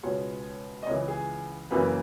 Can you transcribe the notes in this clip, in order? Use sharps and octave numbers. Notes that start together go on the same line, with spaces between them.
C#2 B2 G#3 B3 C#5
D#5
C#2 C#3 E3 C#5
G#4
F#1 F#2 E3 A#3 B4